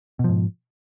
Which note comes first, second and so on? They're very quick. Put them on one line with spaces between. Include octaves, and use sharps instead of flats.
B2 F3 G#2